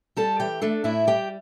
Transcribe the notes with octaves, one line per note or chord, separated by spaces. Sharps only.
G3 A4 A5
E3 G4 G5
A3 D4 A4
A2 E4 E5
G3 G4 G5